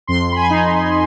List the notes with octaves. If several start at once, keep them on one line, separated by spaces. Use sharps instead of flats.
F2 C6
B5
G#5
D#4